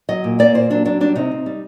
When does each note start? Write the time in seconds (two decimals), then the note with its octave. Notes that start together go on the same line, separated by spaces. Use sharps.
0.09 F#3 D#5
0.24 A#2
0.39 A#3 D5
0.54 A#2 C5
0.70 F#3 D4
0.85 F#3 D4
1.01 G3 D4
1.16 C3 D#4
1.31 C4
1.46 G3